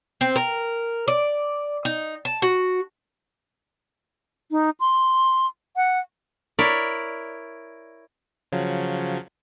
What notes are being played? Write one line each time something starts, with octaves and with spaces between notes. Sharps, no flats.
C4
A#4
D5
D#4
A5
F#4
D#4
C6
F#5
E4 A#4 C#5 D5
C#3 F3 F#3